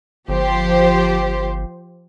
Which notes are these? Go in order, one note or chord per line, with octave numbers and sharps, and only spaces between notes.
G1 F3 G4 C5